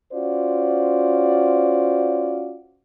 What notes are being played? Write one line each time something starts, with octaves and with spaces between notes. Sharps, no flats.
C#4 F4 F#4 C5 D5